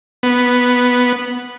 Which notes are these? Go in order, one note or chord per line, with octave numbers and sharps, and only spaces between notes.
B3